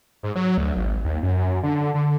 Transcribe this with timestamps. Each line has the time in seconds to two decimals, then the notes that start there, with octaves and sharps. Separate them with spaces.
0.23 G#2
0.35 F#3
0.58 D2
0.76 G#1
1.04 D#2
1.23 F#2
1.37 F#2
1.63 D3
1.94 D3